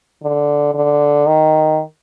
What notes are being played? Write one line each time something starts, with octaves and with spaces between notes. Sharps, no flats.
D3
D3
D#3